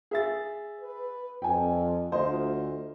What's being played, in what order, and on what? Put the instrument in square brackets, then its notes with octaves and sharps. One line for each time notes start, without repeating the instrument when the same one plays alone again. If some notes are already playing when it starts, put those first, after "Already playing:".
[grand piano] G#4 E5 A6
[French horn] B4
[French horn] F2 [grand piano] G5 G#5
[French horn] D2 [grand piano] F4 C5 D#5